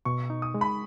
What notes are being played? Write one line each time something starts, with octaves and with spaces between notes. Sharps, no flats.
B2 C#6
D#4
D#6
G#3
B5